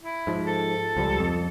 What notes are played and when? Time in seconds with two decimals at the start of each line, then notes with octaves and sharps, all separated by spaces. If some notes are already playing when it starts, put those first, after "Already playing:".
0.02 E4
0.27 G#2 F3
0.47 A4
0.97 C#2 F3 G3
1.19 F2